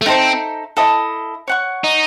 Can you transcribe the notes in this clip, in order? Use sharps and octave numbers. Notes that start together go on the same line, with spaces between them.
A3
C4 D#4 A4 C5 E5
E4 A4 D#5 A5
C#5 F#5 C#6
D#4